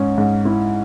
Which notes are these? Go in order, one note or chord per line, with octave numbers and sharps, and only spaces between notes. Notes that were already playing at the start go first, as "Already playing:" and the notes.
Already playing: G#2 C#4
G#2
E4